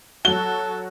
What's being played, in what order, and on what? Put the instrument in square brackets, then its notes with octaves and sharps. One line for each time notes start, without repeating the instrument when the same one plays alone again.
[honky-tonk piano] F#3 F#4 [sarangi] A4 [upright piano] G7